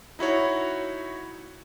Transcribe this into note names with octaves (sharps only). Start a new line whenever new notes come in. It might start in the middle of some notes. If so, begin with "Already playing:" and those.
D#4 E4 F#4 C#5